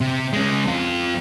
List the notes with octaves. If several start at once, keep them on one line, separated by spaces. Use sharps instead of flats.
C3
G#3 C#4
F2 F4